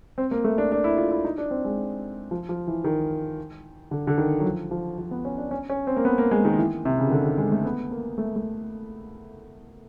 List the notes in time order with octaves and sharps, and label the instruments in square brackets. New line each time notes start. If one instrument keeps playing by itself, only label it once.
[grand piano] C4
A#3
A3
D4
D4
E4
F4
E4
D#4
D4
C4
G#3
F3
F3
E3
D#3
D3
D3
D#3
F#3
F3
F3
F3
B3
C#4
D4
C#4
C#4
C4
A#3
B3
A#3
G#3
D#3
E3
C3
C#3
D#3
D3
D#3
G#3
A3
B3
A#3
A3
A3